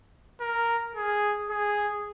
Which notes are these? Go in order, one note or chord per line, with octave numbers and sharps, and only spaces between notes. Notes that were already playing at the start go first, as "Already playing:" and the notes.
A#4
G#4
G#4